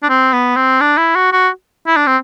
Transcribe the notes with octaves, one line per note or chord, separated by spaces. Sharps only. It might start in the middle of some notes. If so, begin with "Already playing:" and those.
D4
C4
B3
C4
D4
E4
F#4
F#4
E4
D4
C4